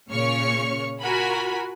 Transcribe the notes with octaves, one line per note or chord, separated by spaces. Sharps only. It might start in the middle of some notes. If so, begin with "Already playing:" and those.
A#2 C#3 C#5 C#6 F6 C#7
F4 F#4 A#4 G#5 B5